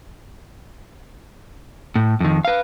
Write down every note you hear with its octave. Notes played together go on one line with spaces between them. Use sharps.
A2
F2 D#3
B4 F5